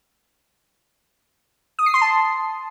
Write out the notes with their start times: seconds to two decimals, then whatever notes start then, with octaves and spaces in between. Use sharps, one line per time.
1.79 D#6
1.86 C7
1.94 C6
2.01 A5